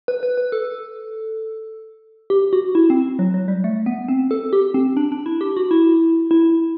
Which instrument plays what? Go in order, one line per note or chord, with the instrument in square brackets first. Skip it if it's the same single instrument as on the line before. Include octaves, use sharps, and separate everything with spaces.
[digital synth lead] B4
B4
B4
A4
G4
F#4
E4
C4
F#3
F#3
G3
A3
B3
C4
A4
G4
C4
D4
D4
E4
G4
F#4
E4
E4